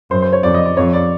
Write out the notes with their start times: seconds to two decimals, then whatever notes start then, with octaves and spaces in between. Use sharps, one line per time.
0.11 F#2 C5
0.22 C5
0.33 C#5
0.43 F2 D5
0.54 D#5
0.66 D5
0.77 F2 C#5
0.93 D5